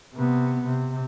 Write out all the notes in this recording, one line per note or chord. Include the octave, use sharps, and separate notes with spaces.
C3 B3
C3